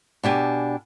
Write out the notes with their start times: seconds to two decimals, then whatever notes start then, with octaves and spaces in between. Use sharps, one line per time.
0.23 B2 D4 G4 G#5